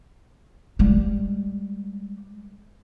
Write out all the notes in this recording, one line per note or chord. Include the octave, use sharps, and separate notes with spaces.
G3 G#3